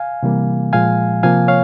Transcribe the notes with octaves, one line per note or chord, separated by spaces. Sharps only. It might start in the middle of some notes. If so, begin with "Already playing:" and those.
Already playing: F5 G#5
C3 E3 G3 A#3
A#2 F3 G#3 F5 G#5
C3 F3 A#3 F5 G#5
C#5 F5